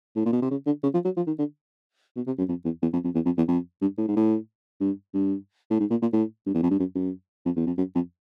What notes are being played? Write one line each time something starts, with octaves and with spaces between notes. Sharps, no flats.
A2
A#2
B2
C3
C#3
D3
C#3
F3
F#3
F3
D#3
D3
B2
C3
F#2
F2
E2
E2
F2
F2
E2
F2
E2
F2
G2
A2
G#2
A2
G2
G2
A2
G#2
A#2
A#2
A2
G2
E2
F2
G2
F#2
F#2
F2
E2
F2
F#2
F2